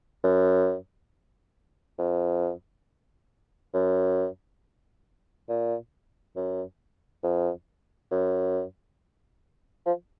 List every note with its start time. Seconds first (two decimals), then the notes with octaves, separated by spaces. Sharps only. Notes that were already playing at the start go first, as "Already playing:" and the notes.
0.24 F#2
1.99 F2
3.74 F#2
5.49 A#2
6.36 F#2
7.23 F2
8.11 F#2
9.86 F3